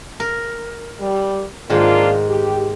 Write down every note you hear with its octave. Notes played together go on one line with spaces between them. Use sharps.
A#4
G3
G#2 D#3 A#3 D4 F4
G4